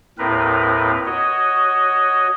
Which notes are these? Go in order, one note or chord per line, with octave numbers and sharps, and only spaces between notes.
D#2 A2 C4 A#4 B4
F#4 C#5 D#5